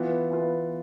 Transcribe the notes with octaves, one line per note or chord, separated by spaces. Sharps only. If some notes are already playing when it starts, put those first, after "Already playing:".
Already playing: E3 B3 F4 B4
E3 B3 F4 B4